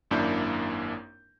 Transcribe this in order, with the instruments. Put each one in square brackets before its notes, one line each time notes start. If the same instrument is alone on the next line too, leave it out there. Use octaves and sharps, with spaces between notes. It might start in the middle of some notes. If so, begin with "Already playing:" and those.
[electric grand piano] G#1 F#2 A#3 D4 E4 G6